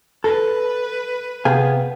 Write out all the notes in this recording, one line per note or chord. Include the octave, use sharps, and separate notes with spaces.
A4 B4
C3 B3 G#4 F5 G5 G#5